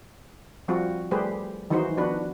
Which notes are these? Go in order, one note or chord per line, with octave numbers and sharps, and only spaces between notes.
F3 G3 C4 F4 F#4
G3 A3 G4 G#4 B4 C5
D#3 E3 F#3 D#4 F#4 C5
F3 B3 D4 F#4 B4